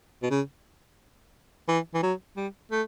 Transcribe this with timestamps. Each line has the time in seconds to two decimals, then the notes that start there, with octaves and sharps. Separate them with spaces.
0.23 B2
0.31 C#3
1.68 E3
1.94 E3
2.03 F#3
2.37 G3
2.72 A3